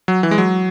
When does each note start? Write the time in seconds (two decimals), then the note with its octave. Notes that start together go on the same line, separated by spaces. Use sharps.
0.08 F#3
0.23 E3
0.31 G#3
0.38 F#3